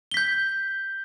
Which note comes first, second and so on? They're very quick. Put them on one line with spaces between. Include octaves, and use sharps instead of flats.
G7 B6 G6